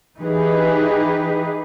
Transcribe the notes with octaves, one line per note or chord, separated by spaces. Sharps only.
E3 D#4 G4 G#4 B4